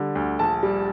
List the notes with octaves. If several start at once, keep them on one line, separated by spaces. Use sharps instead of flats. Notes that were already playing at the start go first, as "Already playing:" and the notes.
Already playing: D3 G3
D2
A#1 A5
G3